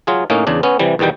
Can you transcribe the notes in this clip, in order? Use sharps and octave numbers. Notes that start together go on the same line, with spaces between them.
F#3 F4 G#4
A2 A#3 C#4 D#4
E2 C#3 D4
B3 C#4
C3 E3 G3
E2 B2 D#3 G3 G5